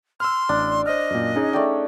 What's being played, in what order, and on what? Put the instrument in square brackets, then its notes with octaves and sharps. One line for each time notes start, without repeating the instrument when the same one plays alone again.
[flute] C6 [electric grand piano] E6 F6
[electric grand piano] A1 [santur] D4
[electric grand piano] C5 F6 [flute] D#5
[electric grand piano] F#2 A#2
C#4 D#4 G#4
[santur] A3 D5 G5